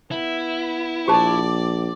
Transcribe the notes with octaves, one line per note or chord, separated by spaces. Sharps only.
B3 E4
A#1 G4 C5 D5 A5 D6